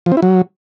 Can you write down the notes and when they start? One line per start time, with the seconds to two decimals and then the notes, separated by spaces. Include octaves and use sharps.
0.06 F3
0.12 C4
0.17 E4
0.22 F#3